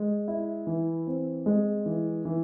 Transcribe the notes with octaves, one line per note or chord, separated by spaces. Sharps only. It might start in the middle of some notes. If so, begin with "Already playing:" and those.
Already playing: G#3
E4
E3
C4
G#3
E3
E3